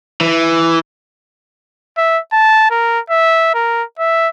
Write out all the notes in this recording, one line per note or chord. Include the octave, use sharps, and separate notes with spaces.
E3
E5
A5
A#4
E5
A#4
E5